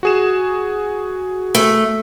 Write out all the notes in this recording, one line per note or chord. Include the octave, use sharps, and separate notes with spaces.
F#4 G#4 E7
A3